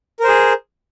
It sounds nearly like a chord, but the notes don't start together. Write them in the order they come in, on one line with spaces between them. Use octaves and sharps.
A#4 C5 G#4